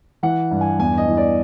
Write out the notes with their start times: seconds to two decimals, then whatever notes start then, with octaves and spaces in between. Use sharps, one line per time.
0.23 E3 F#5
0.51 G2
0.61 G#5
0.79 E2 G#5
0.98 D#5
1.08 E3
1.17 D5